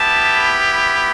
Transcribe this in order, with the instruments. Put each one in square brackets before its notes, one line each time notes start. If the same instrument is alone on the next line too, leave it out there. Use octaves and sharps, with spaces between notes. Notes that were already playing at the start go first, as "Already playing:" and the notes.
Already playing: [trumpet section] B3 E4 G4 A5